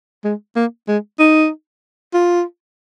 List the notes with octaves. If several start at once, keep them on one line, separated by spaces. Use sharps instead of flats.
G#3
A#3
G#3
D#4
F4